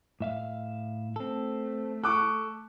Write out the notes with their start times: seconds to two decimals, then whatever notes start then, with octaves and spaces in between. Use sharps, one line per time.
0.20 A2 E5 F5
1.16 A3 C4 A4
2.04 A4 C#6 D6 F#6